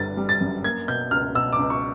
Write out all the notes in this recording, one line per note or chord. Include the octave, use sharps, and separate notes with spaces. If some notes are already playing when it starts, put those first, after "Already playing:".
Already playing: G1 D3 G3 A6
G3
A6
F#2
A#3 G#6
B2 G6
C#2 F6
B2 E6
D6
C#2
C#6